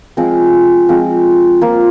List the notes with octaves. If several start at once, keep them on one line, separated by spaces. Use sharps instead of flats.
F3 G#3 C4
F3 G#3 C4
F3 A#3 F4